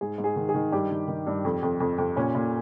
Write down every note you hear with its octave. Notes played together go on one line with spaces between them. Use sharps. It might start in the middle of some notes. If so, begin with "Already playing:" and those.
G#2 G#4
G#2
G#4
D#3
G#4
D#3
G2 G4
D#3
D#3
G2
F2
F2
F2
F2
A#2 C#4
A#2